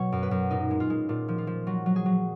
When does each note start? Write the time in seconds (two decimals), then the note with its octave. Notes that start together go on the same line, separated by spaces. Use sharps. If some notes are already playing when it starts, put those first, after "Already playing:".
Already playing: B2 F#3 C#5
0.12 F#2
0.23 B4
0.31 F#2
0.51 A#2 D#4
0.71 G#3
0.80 F4
0.90 G#3
1.09 A#2 F4
1.28 F3
1.38 F4
1.47 F3
1.67 F#3 F#4
1.86 F#3
1.96 G#4
2.06 F#3